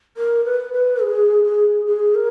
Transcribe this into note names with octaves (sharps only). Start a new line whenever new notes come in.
A#4
B4
B4
G#4
G#4
G#4
A#4